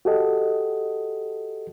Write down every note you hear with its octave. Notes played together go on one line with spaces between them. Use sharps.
F#4 G4 A4 D#5